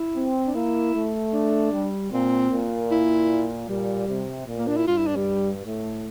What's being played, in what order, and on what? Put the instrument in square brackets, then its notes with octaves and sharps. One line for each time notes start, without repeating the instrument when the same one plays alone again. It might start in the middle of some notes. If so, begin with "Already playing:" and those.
Already playing: [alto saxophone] E4
[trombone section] C4
[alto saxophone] D4
[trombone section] A#3 [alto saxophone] E4
[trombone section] A3
[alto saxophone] D4
[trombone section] G3
[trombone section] A#2 [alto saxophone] C4
[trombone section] A#2
[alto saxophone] E4
[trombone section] A#2 [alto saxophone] G3
[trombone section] C3
A#2
[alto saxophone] A#3
D4
E4
[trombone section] G2 [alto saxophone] F4
[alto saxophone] E4
D4
G3
[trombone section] A2 [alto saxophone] A3